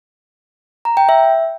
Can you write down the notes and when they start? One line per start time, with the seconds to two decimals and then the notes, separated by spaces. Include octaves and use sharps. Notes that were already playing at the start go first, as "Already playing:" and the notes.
0.85 A#5
0.97 G5
1.09 E5